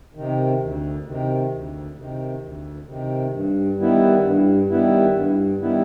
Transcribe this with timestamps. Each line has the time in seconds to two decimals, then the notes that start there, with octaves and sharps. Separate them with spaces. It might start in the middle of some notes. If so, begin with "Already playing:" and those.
0.15 C3 D#3
0.60 D2
1.06 C3 D#3
1.52 D2
1.96 C3 D#3
2.41 D2
2.87 C3 D#3
3.32 G2
3.79 D#3 G3 B3 E4
4.23 G2
4.70 D#3 G3 B3 E4
5.15 G2
5.61 D#3 G3 B3 E4